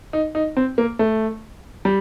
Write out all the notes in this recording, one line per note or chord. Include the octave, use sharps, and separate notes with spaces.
D#4
D#4
C4
A#3
A3
G3